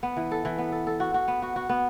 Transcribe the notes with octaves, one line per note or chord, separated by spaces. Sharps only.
B3
E3
A4
E3
B3
A4
A4
F#4
F#4
B3
F#4
F#4
B3